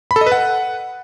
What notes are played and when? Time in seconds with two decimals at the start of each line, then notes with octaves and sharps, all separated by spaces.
0.11 B5
0.16 A4
0.21 D#5
0.26 B4
0.32 F#5